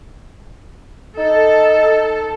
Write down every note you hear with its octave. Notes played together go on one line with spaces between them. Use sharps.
D#4 A4